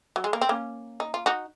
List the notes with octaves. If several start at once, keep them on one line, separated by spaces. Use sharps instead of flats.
F#3
G#3
A#3
C4
A#3 C#4
D#4
F4
D#4 F#4